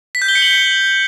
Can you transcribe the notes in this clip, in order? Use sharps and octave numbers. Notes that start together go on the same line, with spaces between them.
B6
G6
G7
C#7
F#7